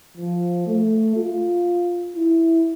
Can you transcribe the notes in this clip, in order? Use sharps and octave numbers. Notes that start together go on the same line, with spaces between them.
F3
A3
F4
E4